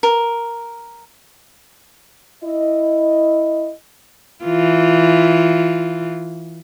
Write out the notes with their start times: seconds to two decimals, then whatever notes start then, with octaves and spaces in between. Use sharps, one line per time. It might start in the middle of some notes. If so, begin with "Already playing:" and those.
0.03 A#4
2.44 E4 D#5
4.44 E3 F4